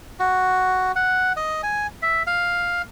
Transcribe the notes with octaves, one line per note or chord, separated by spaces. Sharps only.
F#4
F#5
D#5
G#5
E5
F5